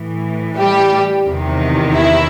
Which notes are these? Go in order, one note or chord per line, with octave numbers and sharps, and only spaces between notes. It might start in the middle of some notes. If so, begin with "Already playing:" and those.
Already playing: A2 E3
G3 G4
E2 C3 D#3
E4 E5